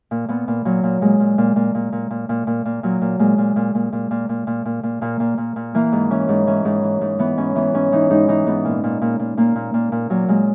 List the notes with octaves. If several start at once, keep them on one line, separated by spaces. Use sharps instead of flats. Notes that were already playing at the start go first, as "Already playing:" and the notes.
A#2
A#2 B3
A#2
A#2 F#3
A#2
A#2 G#3
A#2
A#2
A#2
A#2
A#2
A#2
A#2
A#2
A#2
A#2 F#3
A#2
A#2 G#3
A#2
A#2
A#2
A#2
A#2
A#2
A#2
A#2
A#2
A#2 A#3
A#2
A#2
A#2
E3 A#3
G#2
E3 C#4
G#2
E3 C#4
G#2
E3
G#2
E3 B3
G#2 C#4
E3 B3
G#2 C#4
E3 D#4
G#2 D#4
E3 D#4
G#2 B3
A#2
A#2
A#2
A#2
A#2 A#3
A#2
A#2
A#2
A#2 F#3
A#2 G#3